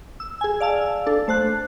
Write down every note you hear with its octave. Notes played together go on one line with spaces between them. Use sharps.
E6
G#4 G#5
D5 F5 A5 E6
D4 A4
A3 C5 A5 F#6